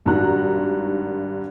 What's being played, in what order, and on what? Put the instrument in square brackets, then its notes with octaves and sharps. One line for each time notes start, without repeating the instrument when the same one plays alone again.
[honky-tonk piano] G#1 G2 D#3 F#4 A#5 F#6